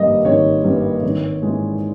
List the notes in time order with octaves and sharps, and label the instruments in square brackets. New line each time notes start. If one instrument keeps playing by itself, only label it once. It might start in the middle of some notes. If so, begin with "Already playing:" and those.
Already playing: [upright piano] G#1 G2 G3 A#3 D#5
G#1 C#5
G2 G3 A#3
G#1
G#2 E3 G#3